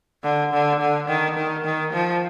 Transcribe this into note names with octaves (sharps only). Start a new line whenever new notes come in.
D3
D3
D3
D#3
D#3
D#3
F3